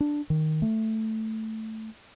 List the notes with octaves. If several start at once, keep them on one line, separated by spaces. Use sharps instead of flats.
D4
D#3
A3